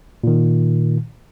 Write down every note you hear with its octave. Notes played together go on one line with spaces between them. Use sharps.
A#2 D#3